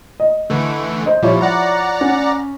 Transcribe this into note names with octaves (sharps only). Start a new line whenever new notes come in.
D#5
D3 E3 A3
C5 D#5
A#2 F3 G3 E4 C#5
D5 F#5 A#5
C#4